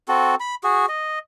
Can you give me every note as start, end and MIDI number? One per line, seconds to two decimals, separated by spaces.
0.08 0.35 60
0.08 0.35 66
0.08 0.35 69
0.40 0.55 83
0.64 0.86 66
0.64 0.86 68
0.89 1.19 75